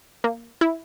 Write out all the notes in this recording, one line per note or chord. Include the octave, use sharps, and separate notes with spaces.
A#3
E4